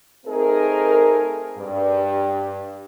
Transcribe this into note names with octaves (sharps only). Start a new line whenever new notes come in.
A3 C4 D#4 G#4 A#4
G2